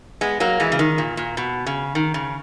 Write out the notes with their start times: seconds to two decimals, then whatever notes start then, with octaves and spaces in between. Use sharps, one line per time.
0.21 G#3 B3
0.40 F#3 A#3
0.60 E3 G#3
0.72 C#3
0.79 D#3
0.98 A#2
1.17 A#2
1.37 B2
1.67 C#3
1.95 D#3
2.14 C#3